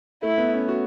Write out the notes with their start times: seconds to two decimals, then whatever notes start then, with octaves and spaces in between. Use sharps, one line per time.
0.23 A3 E4
0.38 B3
0.54 C#4
0.68 F#4